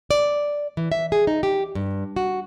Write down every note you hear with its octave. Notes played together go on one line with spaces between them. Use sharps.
D5
E3
E5
G#4
D#4
G4
G2
F#4